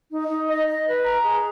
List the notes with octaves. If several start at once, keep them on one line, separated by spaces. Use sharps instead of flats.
D#4
D#4
D#5
D#5
B4
A#5
G#4